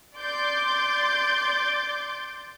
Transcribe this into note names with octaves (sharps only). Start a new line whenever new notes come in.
D5 C6 D6 G6 A6